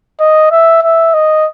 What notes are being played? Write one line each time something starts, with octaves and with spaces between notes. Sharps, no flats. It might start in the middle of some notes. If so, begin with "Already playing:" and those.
D#5
E5
E5
D#5